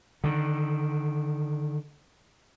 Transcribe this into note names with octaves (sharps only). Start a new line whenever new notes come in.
D3 D#3